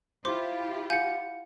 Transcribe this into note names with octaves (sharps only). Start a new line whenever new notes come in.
E4 F4 G4 C5 C6 D6
F5 F#5 G#5 G6 C#7